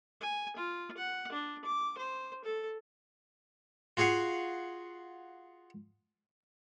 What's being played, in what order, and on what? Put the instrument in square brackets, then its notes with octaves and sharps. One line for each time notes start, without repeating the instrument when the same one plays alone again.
[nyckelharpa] G#5
F4
F#5
D4
D6
C5
A4
[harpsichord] F4 F#4 G#4 F5 F#5